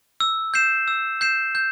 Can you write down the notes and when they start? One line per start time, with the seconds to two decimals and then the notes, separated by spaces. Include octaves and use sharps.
0.20 E6
0.54 G6 C7 E7
0.88 E6
1.21 G6 C7 E7
1.55 G6